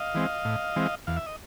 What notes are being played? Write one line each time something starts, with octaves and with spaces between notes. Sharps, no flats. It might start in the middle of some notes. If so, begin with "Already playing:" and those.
Already playing: D#5 F5
E3 G#3 C4
A2
E3 G#3 C4
E2 F5
E5
D#5